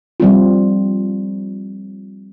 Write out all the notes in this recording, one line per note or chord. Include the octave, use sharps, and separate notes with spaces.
F3 G3 C4 F4